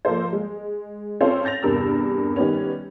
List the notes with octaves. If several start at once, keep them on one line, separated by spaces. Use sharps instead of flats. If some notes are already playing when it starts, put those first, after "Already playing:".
F3 A#3 A4 A#4 C5
G#3
C4 C#4 F4 A4 C5 C#5
G6 A6 A#6 F7
E2 G2 C3 A#4 E6
D#3 G3 B3 C#4